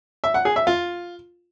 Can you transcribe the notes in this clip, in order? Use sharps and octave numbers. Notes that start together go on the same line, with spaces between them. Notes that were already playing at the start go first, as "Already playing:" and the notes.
E5
F#5
G#4
E5
F4